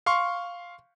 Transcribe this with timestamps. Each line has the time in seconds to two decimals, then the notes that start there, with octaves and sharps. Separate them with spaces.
0.06 F5 C6 C#6